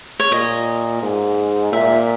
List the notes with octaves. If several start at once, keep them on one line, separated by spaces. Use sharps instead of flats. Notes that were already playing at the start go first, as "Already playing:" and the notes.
C#5
A#2 D#5
G#2
A#2 E5